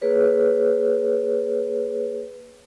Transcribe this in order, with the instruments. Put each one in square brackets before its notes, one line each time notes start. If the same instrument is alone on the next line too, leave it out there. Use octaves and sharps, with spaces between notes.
[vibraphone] A#3 G#4 B4 C#5